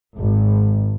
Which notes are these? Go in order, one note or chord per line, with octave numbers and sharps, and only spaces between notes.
G#1